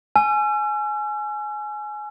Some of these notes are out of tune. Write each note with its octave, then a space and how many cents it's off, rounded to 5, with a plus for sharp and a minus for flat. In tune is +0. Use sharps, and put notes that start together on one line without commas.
G#5 +20 E6 +45